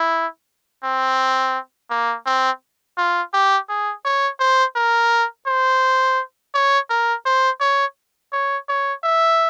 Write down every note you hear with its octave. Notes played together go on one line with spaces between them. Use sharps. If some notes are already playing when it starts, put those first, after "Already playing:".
Already playing: E4
C4
A#3
C4
F4
G4
G#4
C#5
C5
A#4
C5
C#5
A#4
C5
C#5
C#5
C#5
E5